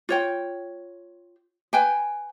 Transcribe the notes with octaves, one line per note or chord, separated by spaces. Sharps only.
F4 C#5 G5
B4 G5 G#5